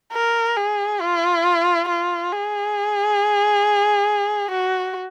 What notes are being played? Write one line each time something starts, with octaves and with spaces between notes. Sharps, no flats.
A#4
G#4
F4
F4
G#4
F#4